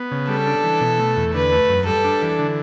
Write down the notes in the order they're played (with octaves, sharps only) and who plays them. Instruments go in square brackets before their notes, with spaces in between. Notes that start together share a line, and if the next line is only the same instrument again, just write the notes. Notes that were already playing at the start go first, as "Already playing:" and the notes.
Already playing: [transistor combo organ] B3
C#3
[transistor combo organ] G3 [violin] A4
[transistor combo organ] D4
E3
B2
A3
E2
[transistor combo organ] D3 [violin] B4
[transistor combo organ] A3
F#2
[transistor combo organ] G3 [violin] A4
[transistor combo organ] D4
E3
D3